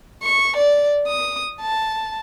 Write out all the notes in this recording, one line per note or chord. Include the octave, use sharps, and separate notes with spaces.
C#6
D5
D#6
A5